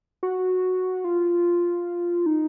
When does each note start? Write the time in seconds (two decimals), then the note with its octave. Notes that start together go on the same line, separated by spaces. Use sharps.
0.23 F#4
1.04 F4
2.26 D#4